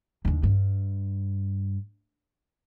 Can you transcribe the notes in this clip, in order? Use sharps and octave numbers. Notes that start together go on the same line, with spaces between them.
D#2 D3
G2